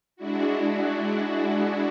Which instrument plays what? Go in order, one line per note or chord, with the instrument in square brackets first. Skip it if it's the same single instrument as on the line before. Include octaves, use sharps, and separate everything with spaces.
[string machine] G#3 D4 E4 F#4